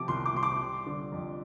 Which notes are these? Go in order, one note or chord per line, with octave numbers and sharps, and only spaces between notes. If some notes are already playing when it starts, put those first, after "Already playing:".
Already playing: C3 F3 D6
C2 C6
D6
C2 C6
D6
G3
D3
F2